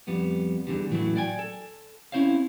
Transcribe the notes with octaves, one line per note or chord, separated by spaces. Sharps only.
F2 G3 B3
E2 D3 G3
A2 E3 F#3 A3
D5 G5 G#5
A4
C4 C#4 E4 C5 C#5 F5